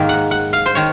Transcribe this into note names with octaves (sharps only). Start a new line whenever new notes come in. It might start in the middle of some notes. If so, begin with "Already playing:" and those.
Already playing: G#2 D#3 A#3
F#5
F#5
F5
C5
D#3 C#5